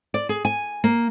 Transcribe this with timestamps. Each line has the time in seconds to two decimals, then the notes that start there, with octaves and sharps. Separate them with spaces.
0.14 D5
0.29 G#4
0.45 G#5
0.84 A#3